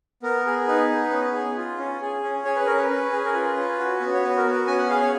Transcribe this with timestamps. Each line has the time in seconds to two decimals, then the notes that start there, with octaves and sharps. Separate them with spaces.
0.23 B3 A#4
0.46 G#4
0.68 D#4 B4
0.89 B3
1.11 C#4
1.34 G#4
1.57 F4
1.78 C#4
2.01 G#4
2.24 C#4
2.45 G#4 C#5
2.56 B4
2.66 C#4 A#4
2.78 B4
2.90 C#4
3.12 G#4
3.25 A#4
3.33 F4 B4
3.57 C#4
3.79 F#4
4.00 B3
4.14 C#5
4.23 F#4 B4
4.37 A#4
4.46 B3
4.52 B4
4.67 C#4 G#5
4.78 F#5
4.89 G#4 F5
5.01 C#5